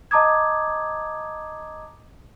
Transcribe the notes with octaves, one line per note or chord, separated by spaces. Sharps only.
D#5 A5 A#5 D6 D#6 G#6